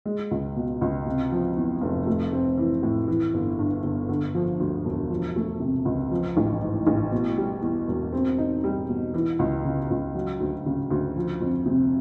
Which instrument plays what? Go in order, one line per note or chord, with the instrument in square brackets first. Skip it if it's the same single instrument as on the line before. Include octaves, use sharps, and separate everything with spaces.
[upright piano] G#3
C#2
B2
C#2
C3
F3
E2
F1
A3
C4
E3
A2
E3
G1
G2
G1
D3
F3
D2
E1
F3
A3
C3
C#2
F3
A1
G#2
A1
B2
G3
E2
E1
C4
D#4
G3
B2
E3
C#2
C#3
C#2
F#3
D2
C#3
D2
F3
F2
C3